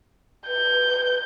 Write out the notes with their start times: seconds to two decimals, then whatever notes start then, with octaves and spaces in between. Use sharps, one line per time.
0.48 B4 G6
0.90 B4